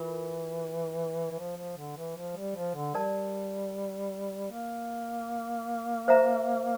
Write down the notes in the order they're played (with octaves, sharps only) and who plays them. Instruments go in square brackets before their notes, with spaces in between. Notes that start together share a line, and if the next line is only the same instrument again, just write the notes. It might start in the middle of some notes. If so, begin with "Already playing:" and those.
Already playing: [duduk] E3 [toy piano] F4 A#4
[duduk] E3
F3
F3
D3
E3
F3
G3
F3
D3
[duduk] G3 [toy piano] A#4 D5 A5
[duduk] A#3
[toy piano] C5 E5 A#5